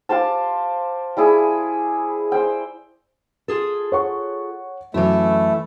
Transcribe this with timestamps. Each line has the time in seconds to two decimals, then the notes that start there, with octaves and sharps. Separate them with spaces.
0.09 F4 G4 C5 A5
1.17 G3 E4 G#4
2.32 C5 G5
3.48 F4 G#4 A4
3.92 C#5 F#5 C#6
4.94 F#2 E3 A3 E4